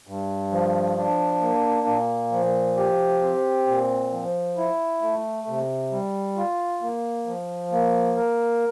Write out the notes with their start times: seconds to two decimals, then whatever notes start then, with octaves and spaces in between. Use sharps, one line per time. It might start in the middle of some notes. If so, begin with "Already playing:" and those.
0.07 G2
0.52 F3
0.98 D4
1.42 A#3
1.87 A#2
2.32 F3
2.77 G4
3.22 C4
3.67 A#2
4.12 F3
4.57 E4
5.02 A3
5.47 C3
5.91 G3
6.37 F4
6.82 A#3
7.26 F3
7.72 A#3
8.17 A#4